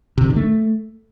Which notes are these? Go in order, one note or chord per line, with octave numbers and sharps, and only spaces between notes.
C3
D#3
D3
A3